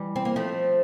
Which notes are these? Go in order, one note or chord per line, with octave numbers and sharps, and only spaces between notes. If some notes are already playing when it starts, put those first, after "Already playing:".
Already playing: E3 G3
C4
A#3
F3 A3